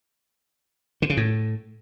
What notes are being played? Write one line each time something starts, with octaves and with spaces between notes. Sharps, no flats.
D3
C#3
A2